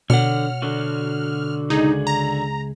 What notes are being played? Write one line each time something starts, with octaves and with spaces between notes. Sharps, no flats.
B2 D3 C#5 F#5 F6
D3 F#4
C#2 D#4 G#4
A#5